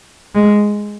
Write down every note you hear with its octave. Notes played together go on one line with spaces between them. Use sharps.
G#3